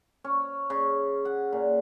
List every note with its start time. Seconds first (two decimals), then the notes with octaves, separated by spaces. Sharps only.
0.24 C#4
0.70 C#3
1.25 F#5
1.52 A#2